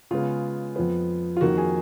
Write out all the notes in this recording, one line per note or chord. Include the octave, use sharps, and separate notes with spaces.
C#3 G#3 B3 F4
F2 F3 B3
F4
F2 D#3 A#3 F#4
G#4